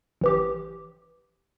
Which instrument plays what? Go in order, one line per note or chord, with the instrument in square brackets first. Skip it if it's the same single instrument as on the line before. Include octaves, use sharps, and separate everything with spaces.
[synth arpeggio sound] A1 E3 G4